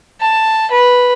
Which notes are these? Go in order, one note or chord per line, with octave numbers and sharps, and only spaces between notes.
A5
B4